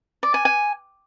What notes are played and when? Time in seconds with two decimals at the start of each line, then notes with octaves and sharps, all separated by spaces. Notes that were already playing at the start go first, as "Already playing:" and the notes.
0.23 D5
0.34 G#5
0.45 G#5